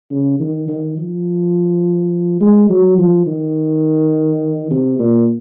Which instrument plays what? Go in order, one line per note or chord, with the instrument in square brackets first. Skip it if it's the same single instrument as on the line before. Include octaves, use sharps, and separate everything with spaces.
[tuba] C#3
D#3
D#3
F3
G#3
F#3
F3
D#3
C3
A#2